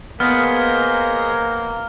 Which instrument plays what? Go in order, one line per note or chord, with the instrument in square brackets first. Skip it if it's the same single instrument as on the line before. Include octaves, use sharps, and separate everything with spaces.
[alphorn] A#3 [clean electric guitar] B3 [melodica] G#4 C5 D#5 [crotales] F6